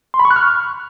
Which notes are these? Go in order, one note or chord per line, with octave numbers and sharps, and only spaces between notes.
C6
B5
C#6
F#6
F6